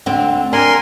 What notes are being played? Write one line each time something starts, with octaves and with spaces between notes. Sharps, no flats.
D2 D3 C4
D4 A#4 G#5 C6